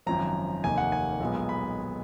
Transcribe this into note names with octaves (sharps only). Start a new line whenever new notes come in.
G#1 F#2 F3 A#5
F1 D#2 D#3 A#3 G#5
F#5
G#5
B1 A#2 G#3 B3
B5